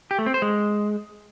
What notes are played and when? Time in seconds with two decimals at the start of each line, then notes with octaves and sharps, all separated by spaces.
0.11 G4
0.19 A3
0.26 C4
0.34 C5
0.42 G#3